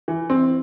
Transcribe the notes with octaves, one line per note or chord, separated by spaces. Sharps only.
E3
C4